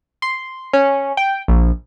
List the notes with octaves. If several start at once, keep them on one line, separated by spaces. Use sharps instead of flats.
C6
C#4
G5
A#1